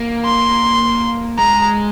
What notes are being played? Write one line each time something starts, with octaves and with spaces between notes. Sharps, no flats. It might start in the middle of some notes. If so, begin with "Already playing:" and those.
Already playing: A#3
C6
G#3 A#5